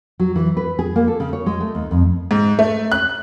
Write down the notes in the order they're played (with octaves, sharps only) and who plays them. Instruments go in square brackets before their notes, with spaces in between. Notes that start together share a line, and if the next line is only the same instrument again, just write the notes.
[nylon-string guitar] F#3
E3
B4
G#4
A#3
A4
C#3
C#5
G#3
A3
D#2
F2
[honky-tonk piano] G#2
A3
F#6